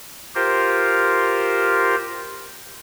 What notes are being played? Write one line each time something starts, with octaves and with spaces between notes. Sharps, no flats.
F4 G4 A#4 C5